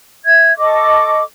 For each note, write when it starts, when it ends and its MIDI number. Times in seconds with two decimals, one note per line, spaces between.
0.24 0.53 76
0.24 0.53 92
0.57 1.21 69
0.57 1.21 75
0.57 1.21 85
0.57 1.21 86